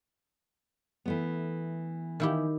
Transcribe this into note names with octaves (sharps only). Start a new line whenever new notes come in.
E3 A3 B3
D#3 E4 G4